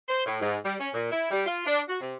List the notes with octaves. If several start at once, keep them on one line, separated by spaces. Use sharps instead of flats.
C5
A2
G#2
G3
C#4
A#2
E4
G3
F4
D4
F#4
C3